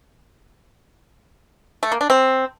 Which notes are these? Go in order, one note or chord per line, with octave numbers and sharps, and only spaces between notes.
A3
A#3
D4
C4